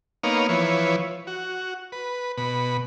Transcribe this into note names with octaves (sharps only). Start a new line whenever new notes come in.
A#3 B3 D#4 C#5 F5
E3 F3 B4 C#5
F#4
B4
B2 B5